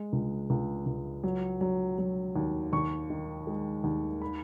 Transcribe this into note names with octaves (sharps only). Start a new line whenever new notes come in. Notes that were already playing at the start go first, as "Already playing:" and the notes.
Already playing: G#3
C#2
C#2
C#2
F#3
F#3
F#3
D#2
D#2 C#6
D#3
G#3
D#2
B5